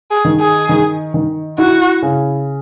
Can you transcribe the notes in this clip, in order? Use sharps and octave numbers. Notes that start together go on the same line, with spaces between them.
G#4
D#3
G#4
D#3
D#3
E4 F#4
C#3